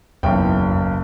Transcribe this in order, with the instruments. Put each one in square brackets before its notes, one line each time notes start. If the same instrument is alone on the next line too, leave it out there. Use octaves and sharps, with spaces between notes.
[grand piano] F#1 B1 G5 [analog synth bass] E2